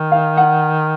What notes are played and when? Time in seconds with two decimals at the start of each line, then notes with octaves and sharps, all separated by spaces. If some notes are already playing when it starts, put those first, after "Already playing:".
Already playing: D#3
0.12 F5
0.37 F#5